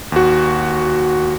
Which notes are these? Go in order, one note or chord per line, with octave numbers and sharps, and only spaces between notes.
D#2 F#4